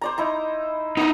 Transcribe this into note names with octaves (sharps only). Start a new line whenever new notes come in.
C5 D5 A#5
D#4 E4 A#5
B3 D#4 E4 E6